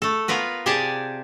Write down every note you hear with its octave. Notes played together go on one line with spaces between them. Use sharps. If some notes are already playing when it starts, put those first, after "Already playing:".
A3 A4
B3 F4 A#4 B4
C3 G4 G#4 D5 G#5 A5